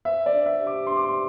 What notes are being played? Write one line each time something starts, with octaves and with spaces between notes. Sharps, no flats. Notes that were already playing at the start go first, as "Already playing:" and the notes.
C5 E5
D5
D4
E5
G4
D6
D4 C6
D6
C6